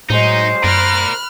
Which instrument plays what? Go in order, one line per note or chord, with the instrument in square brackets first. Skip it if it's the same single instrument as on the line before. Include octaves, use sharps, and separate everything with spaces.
[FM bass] A2 [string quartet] F#3 G#3 [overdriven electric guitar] D#4 [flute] C5
[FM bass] F#2 [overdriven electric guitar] A#4 D5 [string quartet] B5 F6 F#6